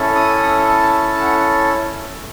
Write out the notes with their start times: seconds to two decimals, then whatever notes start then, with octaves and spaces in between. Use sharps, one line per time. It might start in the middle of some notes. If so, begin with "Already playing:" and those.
Already playing: C#4 E4 A4
0.15 D#6
0.68 A5
1.21 F#5